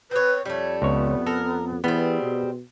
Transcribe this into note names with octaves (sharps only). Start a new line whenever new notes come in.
C4 B4 C#5
F2 G3 A3 C#5
C#2 B3 C#5
A4 A#4
E3 G3 B3 C4 G#4
B2